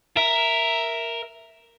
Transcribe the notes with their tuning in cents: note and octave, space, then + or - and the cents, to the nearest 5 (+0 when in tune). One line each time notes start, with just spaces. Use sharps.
A#4 +0 E5 +0